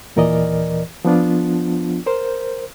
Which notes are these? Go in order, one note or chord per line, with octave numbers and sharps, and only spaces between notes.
D#2 A#2 E3 A#4 D5 D#5
F3 B3 D4 F4
A#4 C5